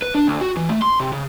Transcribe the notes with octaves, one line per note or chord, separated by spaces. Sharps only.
B4
D4
D2
F#4
E3
A3
C6
C3
C#3